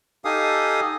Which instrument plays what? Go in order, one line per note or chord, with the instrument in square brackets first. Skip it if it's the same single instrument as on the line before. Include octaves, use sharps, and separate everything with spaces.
[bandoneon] D#4 G4 A4 F5 G#5 D#6